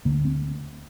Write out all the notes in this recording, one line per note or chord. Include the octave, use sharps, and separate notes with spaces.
D2 D3 A#3
C4